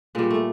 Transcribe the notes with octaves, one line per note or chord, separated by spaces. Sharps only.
A#2 G3 G#3
A3